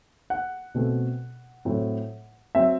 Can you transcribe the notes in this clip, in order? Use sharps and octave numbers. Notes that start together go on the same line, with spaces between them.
F#5
B2 A3 C4
A2 F#3 C4
F#3 C4 E5